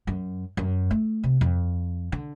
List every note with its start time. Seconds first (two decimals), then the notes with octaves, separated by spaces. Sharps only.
0.07 F#2
0.57 F#2
0.91 A3
1.23 C3
1.41 F2
2.12 D3